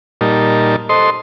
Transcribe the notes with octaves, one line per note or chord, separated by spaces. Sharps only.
A#2 G3 D#4 A#4 A5
A4 C5 D#5 C6